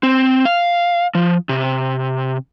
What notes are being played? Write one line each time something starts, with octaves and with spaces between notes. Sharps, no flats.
C4
F5
F3
C3